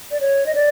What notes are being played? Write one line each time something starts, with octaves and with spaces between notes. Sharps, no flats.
D5
C#5
D#5
D5